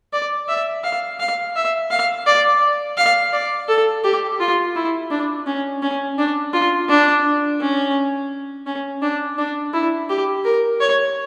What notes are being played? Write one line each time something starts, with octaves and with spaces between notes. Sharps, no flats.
D5
E5
F5
F5
E5
F5
D5
F5
D5
A4
G4
F4
E4
D4
C#4
C#4
D4
F4
D4
C#4
C#4
D4
D4
E4
G4
A#4
C#5